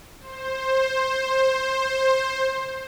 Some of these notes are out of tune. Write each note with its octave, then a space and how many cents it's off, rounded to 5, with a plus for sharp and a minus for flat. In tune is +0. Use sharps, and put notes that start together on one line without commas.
C5 +15